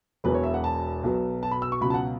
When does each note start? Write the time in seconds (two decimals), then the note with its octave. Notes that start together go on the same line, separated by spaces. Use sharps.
0.24 E1 E2 B2 F#3 B4
0.34 C#5
0.43 E5
0.54 F#5
0.64 A5
1.03 B1 B2 F#3 B3
1.43 A5
1.51 B5
1.62 E6
1.72 C#6
1.81 C#2 B2 F#3 B5
1.90 A5
1.94 F#5